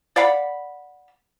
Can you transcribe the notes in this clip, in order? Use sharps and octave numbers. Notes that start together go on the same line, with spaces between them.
D5 F5 F#5 B5